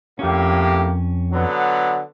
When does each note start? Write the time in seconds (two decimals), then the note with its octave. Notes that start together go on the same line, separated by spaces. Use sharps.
0.19 F2 A2 A#3 C#4 G4
1.31 D3 F#3 B3